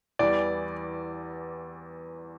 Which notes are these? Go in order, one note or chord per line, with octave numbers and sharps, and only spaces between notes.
E2 E3 G3 D5